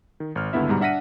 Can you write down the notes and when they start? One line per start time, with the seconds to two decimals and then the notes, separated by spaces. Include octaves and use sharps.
0.20 D#3
0.35 G#1 F6
0.53 C#2 G2 D3 B3 E4 E5
0.69 G#2 B2 G3 A#5
0.80 D4 E5 F#5 A#6 B6 D#7